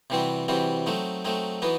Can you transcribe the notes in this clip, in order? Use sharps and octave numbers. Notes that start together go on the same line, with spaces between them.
C3 E3 G3 C4 F#4
C3 E3 G3 C4 F#4
F#3 A3 C4 D#4
F#3 A3 C4 D#4
E3 B3 D#4 F#4